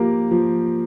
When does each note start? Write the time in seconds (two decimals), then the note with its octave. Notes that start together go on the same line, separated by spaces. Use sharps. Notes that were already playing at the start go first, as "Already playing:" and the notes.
Already playing: F3 A#3 G4 A#4
0.31 F3